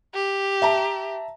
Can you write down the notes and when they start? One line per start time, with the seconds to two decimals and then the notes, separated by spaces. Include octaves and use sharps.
0.14 G4
0.62 E5 A5 A#5